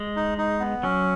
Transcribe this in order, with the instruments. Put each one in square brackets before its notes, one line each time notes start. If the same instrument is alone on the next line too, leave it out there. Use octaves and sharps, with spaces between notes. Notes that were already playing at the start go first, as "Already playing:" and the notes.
Already playing: [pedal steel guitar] G#3
[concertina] D#4
D#4
B3
[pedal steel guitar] F#3 [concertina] C#4